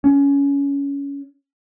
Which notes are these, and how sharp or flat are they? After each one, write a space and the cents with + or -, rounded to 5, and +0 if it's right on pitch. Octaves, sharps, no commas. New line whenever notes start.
C#4 +20